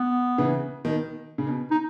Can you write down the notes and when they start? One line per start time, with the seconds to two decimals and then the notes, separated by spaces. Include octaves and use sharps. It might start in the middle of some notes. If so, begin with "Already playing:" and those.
Already playing: B3
0.38 C#3 E3
0.85 B2 D#3
1.38 C#3
1.47 B2
1.71 D#4